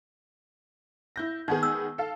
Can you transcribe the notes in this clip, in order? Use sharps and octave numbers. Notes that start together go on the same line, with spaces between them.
E4 G6 A#6
D#3 B3 D#4 G#4
E6
A4 F5